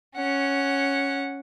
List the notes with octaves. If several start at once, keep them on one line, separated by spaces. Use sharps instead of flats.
C#4 F#5